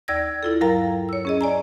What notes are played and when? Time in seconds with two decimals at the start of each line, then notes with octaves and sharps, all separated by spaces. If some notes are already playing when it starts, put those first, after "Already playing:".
0.08 D#2 D5 E6 G#6 A#6
0.43 E4 F4 A4
0.61 G2 F#3 A#4 F5 G5 A#5
1.09 C#5 E6
1.25 C#4 G#4 D#5
1.41 D5 G#5 A#5